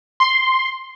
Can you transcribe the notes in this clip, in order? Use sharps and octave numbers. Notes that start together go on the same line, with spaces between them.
C6